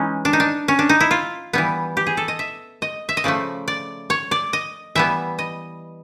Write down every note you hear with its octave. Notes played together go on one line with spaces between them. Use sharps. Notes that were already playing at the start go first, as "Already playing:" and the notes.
Already playing: E3 G#3 C#4 D#4
D4
D#4
D4
C#4
D4
D#4
E4
F4
E3 G3 B3
G4
G#4
A4
D#5
E5
D#5
E5
D#5
C#3 F3 A3 D5
D5
C#5
D5
D#5
E3 G3 B3 E5
D#5